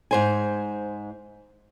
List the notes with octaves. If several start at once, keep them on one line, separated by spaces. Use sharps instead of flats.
G#2 C5 G#5